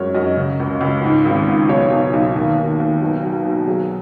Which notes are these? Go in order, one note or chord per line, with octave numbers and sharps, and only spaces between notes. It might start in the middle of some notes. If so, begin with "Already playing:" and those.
Already playing: F#2 G#3 C#5
F#2 D#5
C#3
C#2
C#2
G#2
G#1
G#2
B1 C#5
B1
B1
D#2
D#2
D#2
B1
F#3
B2
F#3 G#4